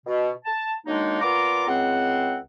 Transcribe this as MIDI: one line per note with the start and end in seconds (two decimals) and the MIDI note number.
0.07 0.30 47
0.45 0.71 81
0.87 1.18 51
0.87 1.18 54
0.87 1.18 56
0.87 1.18 58
0.87 1.18 62
0.87 1.18 63
1.22 1.65 46
1.22 1.65 59
1.22 1.65 65
1.22 1.65 82
1.22 1.65 86
1.68 2.38 37
1.68 2.38 60
1.68 2.38 78